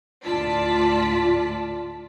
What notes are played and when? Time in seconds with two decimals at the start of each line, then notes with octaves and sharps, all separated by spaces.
0.24 D2 A2 F4 D5 A5 B6